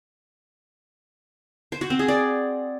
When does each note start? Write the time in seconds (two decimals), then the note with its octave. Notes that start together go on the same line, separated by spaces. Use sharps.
1.72 C5
1.81 F#4
1.90 C4
1.99 G#4
2.08 D5